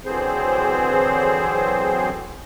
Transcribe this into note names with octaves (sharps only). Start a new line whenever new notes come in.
D3 E3 F#3 C4 G#4 C5